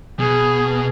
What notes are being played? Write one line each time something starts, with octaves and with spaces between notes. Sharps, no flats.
B2 G#4